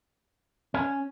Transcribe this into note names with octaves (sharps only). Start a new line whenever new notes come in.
C#4